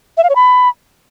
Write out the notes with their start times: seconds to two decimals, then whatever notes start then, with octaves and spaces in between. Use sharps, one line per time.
0.17 E5
0.23 F5
0.29 C#5
0.35 B5